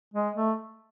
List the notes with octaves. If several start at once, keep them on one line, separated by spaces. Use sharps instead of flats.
G#3
A3